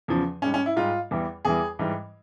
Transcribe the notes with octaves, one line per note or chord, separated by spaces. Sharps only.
E2 C#3 F3
G#2 G3 C#4
C#4
E4
G#2 G3 F4
E2 E3 G3
E2 E3 G3 G#4
G#2 E3 G3